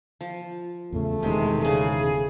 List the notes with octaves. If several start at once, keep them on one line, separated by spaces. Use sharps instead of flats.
F3
E2 A2 C#3 A3
E1 C3 D#3 E3 G#3
C#3 G#4